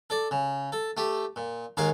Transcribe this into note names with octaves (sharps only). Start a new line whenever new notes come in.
A4 D5
C#3
A4
A3 G4
A#2
D#2 G#2 G#4 A#4 F5